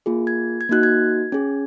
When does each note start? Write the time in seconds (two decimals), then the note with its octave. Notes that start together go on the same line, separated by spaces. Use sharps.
0.06 A#3 F4 G#4
0.27 G#6
0.61 G#6
0.69 A#3 D#4 F#4 F#6
0.83 G#6
1.32 C#4 G#4